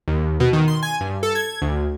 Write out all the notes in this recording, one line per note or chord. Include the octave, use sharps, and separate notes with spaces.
D#2
B2
D#3
C6
G#5
G2
A4
G#6
D2